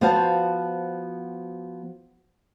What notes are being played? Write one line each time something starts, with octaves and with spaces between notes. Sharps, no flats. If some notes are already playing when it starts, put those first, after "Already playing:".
F3 B3 F#4 C5 F5 A5